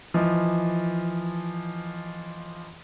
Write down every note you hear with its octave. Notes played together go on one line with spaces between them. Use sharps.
E3 F3 D#5